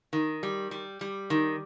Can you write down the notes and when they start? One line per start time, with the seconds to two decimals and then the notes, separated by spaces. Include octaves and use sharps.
0.13 D#3
0.43 G3
0.71 G3
1.01 G3
1.30 D#3